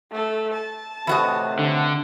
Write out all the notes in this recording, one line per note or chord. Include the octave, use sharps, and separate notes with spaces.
A3 A4
A5
A2 C3 E3 F#4 D#5
D3